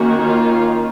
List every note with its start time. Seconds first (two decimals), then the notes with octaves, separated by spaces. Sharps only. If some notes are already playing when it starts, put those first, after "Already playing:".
Already playing: D#3 A#3 C#4 F#4
0.24 F4